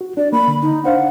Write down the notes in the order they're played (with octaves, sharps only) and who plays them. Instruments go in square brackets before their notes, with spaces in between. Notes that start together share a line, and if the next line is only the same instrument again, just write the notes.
[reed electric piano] F#4
[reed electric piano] D4 [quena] D5
[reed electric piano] A#3 [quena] B5
[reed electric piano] D3
[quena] D#4
[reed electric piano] D4 C5 F5 [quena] F#5